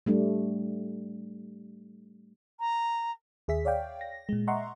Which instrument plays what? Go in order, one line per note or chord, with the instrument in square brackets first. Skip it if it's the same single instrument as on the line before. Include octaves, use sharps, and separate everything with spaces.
[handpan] G3 A3 D4
[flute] A#5
[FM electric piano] D#2 G#4 E5 B6
C#5 D5 F5 G5
A#6
A#2 G#3
D#5 E5 F#5 A#5 C6 C#6